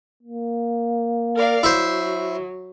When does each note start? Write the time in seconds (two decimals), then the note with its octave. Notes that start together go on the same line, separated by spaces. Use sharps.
0.23 A#3
1.35 A#4 D5 F5
1.63 F#3 E4 C5